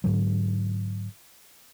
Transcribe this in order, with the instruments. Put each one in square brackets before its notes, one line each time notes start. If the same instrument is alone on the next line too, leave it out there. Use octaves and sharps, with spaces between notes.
[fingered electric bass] G#2 D3 F#3